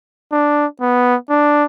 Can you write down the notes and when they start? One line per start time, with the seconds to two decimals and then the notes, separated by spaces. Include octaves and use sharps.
0.32 D4
0.81 B3
1.30 D4